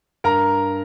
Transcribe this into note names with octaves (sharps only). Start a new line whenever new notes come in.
G2 A#4 A#5